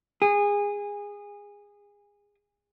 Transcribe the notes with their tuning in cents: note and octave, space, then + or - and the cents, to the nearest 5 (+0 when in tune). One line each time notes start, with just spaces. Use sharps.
G#4 -20